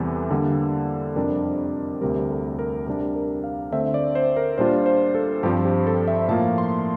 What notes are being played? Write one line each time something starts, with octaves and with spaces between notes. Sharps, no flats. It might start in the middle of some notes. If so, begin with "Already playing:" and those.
Already playing: E2 C3 E3 G3 A4
D3 G3 A#3 A4
F2 C3 G3 D4 A#4
D2 C3 G3 A#4
A4
A#4
C3 G3 D4 A#4
A#4
F5
D3 A3 C4 E5
D5
C5
A#4
A#2 G3 D4 F4 C5
C5
A4
G2 F3 C4 G4
G4
A4
E5
A2 F3 A#3 F4 A5
C6